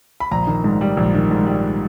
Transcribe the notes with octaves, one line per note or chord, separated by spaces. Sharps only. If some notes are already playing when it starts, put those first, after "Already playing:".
B5
A#1 A#5
D#3
G#2
G3
A#1
D#3
G#2
G3